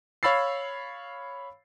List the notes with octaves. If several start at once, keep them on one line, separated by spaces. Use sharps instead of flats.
C#5 F5 B5 E6 A6 C7